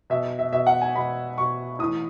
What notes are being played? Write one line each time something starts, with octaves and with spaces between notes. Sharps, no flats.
B2 E5
E5
B2 E5
F#5
G#5
B2 B5
B2 C#6
A2 E3 D#6